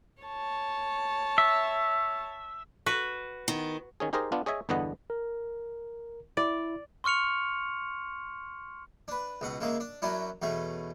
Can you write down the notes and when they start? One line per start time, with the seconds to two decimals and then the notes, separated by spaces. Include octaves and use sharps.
0.22 C#5 A5
1.38 E5
2.86 F#4 B4
3.48 D#3 B3
4.00 D#3 C#4 G#4
4.13 D#4 G4 G#4 A#4 C5 D#5
4.32 B3 D4 F4
4.46 G#4 C#5 D#5 E5 G#5
4.69 G1 E2 D3 B3 D#5 F#5
5.10 A#4
6.37 E4 D5
7.04 C6 C#6 F6 C#7 F7
9.08 D4 B4
9.41 C#2 B2 F#5
9.60 C#3 G#3 A#3 E5
9.80 D4
10.02 F#2 F#3 C#4 D4 E4
10.42 E2 B2 A3 C#4